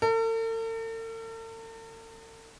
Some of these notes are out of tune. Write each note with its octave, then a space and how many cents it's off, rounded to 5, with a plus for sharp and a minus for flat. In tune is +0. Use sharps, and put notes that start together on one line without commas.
A4 +45